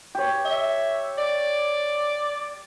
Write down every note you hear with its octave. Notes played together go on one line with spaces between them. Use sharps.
G4 C#5
E5
D5